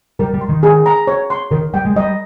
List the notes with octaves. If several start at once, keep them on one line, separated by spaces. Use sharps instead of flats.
G3 A#4
G3
C6
D#3
G#4
A#5
C#5
C6
D#3 A#4
G3 G5
G#3
G3 D#5